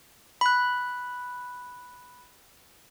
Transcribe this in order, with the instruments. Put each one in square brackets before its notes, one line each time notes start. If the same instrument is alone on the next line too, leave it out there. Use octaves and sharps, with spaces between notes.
[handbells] B5 F#6